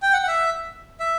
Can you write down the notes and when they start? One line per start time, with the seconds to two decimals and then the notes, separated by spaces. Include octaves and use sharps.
0.02 G5
0.13 F#5
0.23 F#5
0.28 E5
1.00 E5